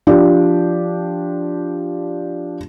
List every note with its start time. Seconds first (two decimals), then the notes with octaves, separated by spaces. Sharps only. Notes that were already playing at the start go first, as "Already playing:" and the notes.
0.07 F3 D4 G4